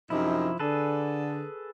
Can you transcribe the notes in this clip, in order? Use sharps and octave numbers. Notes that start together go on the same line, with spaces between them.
F#2 C3 F3 D#4 E4
D3 G#4 A4 B4